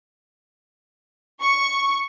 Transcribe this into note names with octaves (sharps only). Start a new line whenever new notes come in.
C#6